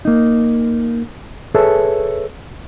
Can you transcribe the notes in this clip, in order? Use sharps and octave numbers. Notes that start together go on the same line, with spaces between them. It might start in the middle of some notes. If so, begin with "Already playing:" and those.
A#3 D#4
G#4 A4 B4 C#5 E5 A5